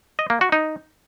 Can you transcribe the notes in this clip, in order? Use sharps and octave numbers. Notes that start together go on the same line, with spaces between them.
D#5
A#3
F#4
D#4